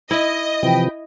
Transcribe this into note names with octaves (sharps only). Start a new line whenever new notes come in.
E4 D#5
C3 E3 F3 G5 B5